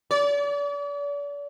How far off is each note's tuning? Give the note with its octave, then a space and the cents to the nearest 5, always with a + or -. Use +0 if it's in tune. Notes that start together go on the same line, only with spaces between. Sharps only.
D5 -40